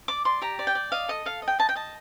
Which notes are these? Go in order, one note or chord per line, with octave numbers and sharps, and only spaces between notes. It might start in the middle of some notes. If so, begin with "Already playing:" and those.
D5 D6
D5 C6
G4 A#5
D5
G5
D5
D#5 F5
A4 D#5
A4 F5
D#5
G5
D#5 A5
G5
D#5 A5